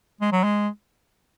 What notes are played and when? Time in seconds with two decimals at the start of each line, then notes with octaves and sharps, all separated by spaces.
0.21 G#3
0.32 F#3
0.44 G#3